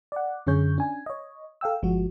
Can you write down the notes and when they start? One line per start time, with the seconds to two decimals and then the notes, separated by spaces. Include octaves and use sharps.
0.12 D5 F#5
0.47 F#2 D3 C#4 G#4 C#5 G6
0.78 C#4 D4 G#5
1.06 C#5 D#5
1.61 A4 F5 G5 E6
1.82 G1 F3 G#3 F#4